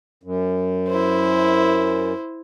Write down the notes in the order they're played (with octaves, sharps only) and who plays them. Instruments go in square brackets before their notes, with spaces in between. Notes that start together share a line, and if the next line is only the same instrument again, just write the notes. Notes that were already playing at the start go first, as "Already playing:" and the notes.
[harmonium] F#2
[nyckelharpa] E4 C5